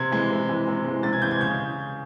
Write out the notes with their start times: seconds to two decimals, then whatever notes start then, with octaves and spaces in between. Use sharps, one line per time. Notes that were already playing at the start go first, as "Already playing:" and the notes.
Already playing: C3 G#6
0.11 E3 G#3
0.30 C3
0.49 E3 G#3
0.67 C3
0.85 E3 G#3
1.03 C3 A6
1.13 G#6
1.22 E3 G#3 G6
1.31 G#6
1.40 C#3 G6